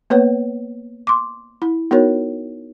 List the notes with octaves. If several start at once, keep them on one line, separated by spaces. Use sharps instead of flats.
A#3 B3 B4 C#5
C6 D6
E4
B3 D#4 F#4 A#4 C#5